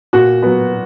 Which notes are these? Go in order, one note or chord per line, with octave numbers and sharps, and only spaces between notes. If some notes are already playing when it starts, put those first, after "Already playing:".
A#2 F#4
F#3 B3